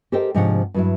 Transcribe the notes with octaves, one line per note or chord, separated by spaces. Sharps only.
G4 A4 A#4 C5 D#5 G5
G#2 C3 F3 D4 C#5 F#5
G2 F#3 E4